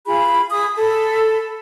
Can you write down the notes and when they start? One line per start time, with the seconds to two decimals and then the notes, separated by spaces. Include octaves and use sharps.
0.06 F4 G#4 B5
0.50 G#4 B5 D#6
0.75 A4 B5